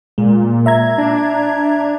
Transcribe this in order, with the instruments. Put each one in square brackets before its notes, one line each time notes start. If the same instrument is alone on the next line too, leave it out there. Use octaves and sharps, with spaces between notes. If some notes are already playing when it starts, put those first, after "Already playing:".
[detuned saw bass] A#2 [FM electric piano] G#3
[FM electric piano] E5 A#5 G#6
[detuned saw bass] D4